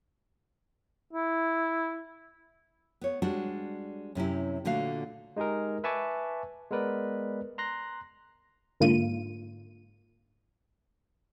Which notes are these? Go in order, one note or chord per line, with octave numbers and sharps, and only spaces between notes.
E4
B3 C#5
G3 G#3 D4 F#4
F#2 C3 C#4 E4
A#2 D3 A3 F#4 F5
G#3 D#4 G4 G#4 A#4
B4 E5 G#5 A5 C#6 D6
G#3 B3 A#4 B4 D5
A#5 C6 F#6 A#6
G#2 D3 A#3 F4 D#7